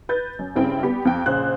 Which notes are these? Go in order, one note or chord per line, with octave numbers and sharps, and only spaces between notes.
B4 G6 A6
F#2
G2 C#3 C4 E4 G5
G3 B3 G4
F2 G5
A#1 C#3 C5 F#6